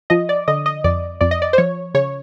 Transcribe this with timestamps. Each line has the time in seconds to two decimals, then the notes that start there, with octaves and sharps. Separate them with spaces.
0.10 F3 D#5
0.29 D5
0.48 D3 D#5
0.66 D#5
0.84 F2 D5
1.21 F2 D5
1.31 D#5
1.42 D5
1.53 C5
1.58 F3 C#5
1.94 C#3 C#5